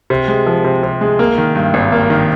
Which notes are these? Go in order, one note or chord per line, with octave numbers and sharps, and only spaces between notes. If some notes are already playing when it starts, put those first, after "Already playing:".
C3
G#3
F3
C3
C3
G#3
A#3
D#3
G2
G#1
A#3
D#3